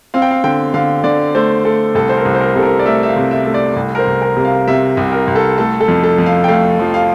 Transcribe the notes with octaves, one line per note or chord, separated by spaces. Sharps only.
C4 F5
G5
F5
D3 G5
D3 F5
D3 D5
A3 C5
A3 A4
C2 A4
C5
A#4
C2
C5
A#4
C3 A4
A#4
D5
A3 E5
E5
F5
C3
E5
A3
D5
C2
A#4
C5
C2
A#4
C3
F5
C3 E5
C2
A#4
C2
A4
A3 A4
A4
F2
A4
F2
F5
G5
A3 F5
F3
F5